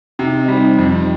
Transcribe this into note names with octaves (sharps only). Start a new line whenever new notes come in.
C3 C4 D#4
G3
F2